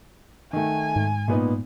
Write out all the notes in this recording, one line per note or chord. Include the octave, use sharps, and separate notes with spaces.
D#3 A3 G#5
G#2
A#2 B3 D#4